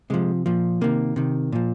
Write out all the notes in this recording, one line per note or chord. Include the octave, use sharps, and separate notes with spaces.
C3 F3 G#3
A#2 F3
C3 D#3 A#3
C3 D#3
A#2 F3